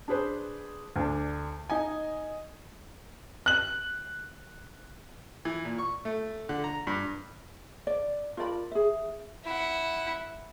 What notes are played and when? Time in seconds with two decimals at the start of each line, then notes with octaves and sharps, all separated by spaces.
0.08 D4 G#4 B4 C5
0.96 D2 D4
1.70 D#4 D#5 G#5
3.46 F#6 F#7
5.45 E3
5.65 A#2
5.79 C#6
6.05 A3
6.49 D3
6.64 A#5
6.87 G2
7.87 D5
8.37 F4 A#4 D5 B5
8.71 G#4 E5
9.44 E4 F#5